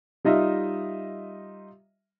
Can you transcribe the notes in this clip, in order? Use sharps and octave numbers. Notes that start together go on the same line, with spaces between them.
G3 D#4 F4 D#5 E5